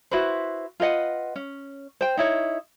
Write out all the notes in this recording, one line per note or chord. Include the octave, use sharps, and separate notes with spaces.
E4 F#4 B4 C5
F4 B4 D#5 F#5
C#4
C5 G5
D#4 E4 C#5